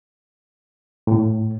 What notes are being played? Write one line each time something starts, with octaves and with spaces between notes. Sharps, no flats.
A2